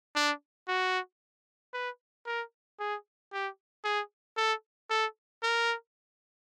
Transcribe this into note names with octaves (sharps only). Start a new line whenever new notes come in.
D4
F#4
B4
A#4
G#4
G4
G#4
A4
A4
A#4